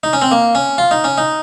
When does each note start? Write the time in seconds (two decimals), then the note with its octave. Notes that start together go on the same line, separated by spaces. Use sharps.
0.03 D#4
0.13 C#4
0.22 C4
0.31 A#3
0.55 C#4
0.78 F4
0.91 D#4
1.04 C#4
1.18 D#4